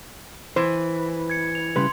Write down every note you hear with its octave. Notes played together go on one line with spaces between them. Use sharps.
E3 C5
G#6 C#7
F7
C#3 G3 B4 C6